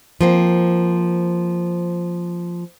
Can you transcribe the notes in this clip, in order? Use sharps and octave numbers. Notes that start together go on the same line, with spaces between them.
F3 A#3 C4